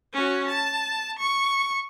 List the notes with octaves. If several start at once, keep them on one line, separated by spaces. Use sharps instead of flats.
C#4 F#4
A5
C#6